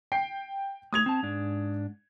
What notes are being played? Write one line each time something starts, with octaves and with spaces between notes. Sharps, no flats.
G5 C7
A3 D#6 G#6 F7
C4 A5
G#2 D4